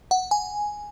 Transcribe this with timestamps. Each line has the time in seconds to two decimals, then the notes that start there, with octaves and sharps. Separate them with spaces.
0.11 F#5
0.31 G#5